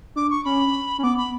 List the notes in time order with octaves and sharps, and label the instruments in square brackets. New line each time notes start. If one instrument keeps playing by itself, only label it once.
[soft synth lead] D4 [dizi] D6
[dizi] C#6
[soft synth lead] C#4 [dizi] B5
[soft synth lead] C#4
[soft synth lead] B3 [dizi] D6
[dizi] B5